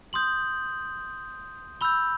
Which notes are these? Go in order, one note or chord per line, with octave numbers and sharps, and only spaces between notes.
C6 D#6 G6 F#7
B5 E6 G6 G7